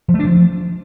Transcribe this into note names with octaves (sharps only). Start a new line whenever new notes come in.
F3
A3
D4
F3